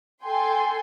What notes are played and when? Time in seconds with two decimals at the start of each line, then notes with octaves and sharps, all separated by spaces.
0.24 A4 G5 G#5 C6